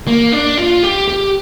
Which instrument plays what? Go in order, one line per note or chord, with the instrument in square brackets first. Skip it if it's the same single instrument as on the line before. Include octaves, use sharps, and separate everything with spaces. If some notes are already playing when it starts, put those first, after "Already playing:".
[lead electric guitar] A#3
D4
F4
G4
G4